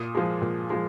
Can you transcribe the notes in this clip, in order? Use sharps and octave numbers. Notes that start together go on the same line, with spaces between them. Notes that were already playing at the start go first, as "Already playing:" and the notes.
Already playing: A#2 D#6
F3 G#3
A#2
F3 G#3